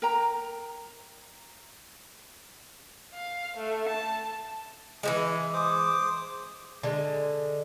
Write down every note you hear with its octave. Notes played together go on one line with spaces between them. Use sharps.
A#4 G5 A#5
F5
A3
A5
E3 F3 G#3
C5 D6 D#6
D3 G#3